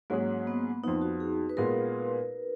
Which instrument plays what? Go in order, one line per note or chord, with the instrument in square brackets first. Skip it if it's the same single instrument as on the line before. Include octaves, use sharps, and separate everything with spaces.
[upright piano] G#2 F#3 C#4 G#4 [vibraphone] A#3
[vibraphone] B3
[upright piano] F2 F3 B3 [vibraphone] D#4
[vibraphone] F#4
G#4
B4
[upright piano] A#2 G#3 B3 F4 G#4 [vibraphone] A#4